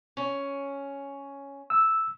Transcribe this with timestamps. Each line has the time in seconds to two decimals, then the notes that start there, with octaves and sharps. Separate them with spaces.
0.17 C#4
1.70 E6